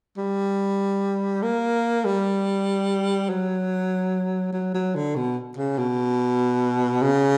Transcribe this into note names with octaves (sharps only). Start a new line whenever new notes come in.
G3
A#3
G3
F#3
F#3
F#3
D3
B2
C#3
B2
C#3